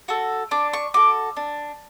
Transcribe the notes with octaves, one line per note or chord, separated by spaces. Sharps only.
F#4 A4
D4 D6
C#6
F#4 A4 D6
D4